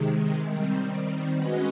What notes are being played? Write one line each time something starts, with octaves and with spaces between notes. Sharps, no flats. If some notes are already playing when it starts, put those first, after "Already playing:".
Already playing: C3 D#3 G#3
D#3 G3 C4
G#3 C#4 F#4 B4 D#5